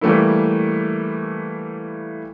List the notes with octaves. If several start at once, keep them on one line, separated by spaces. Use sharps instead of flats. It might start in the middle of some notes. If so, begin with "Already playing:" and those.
E3 G3 A3 A#3 E4